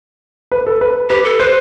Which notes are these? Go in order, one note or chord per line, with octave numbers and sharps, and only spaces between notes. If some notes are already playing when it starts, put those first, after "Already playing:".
B4
A4
B4
G4 B4
A4
B4 C5